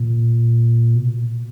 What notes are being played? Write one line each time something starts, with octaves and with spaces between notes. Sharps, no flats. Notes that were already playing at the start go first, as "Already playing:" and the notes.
Already playing: A#2
B2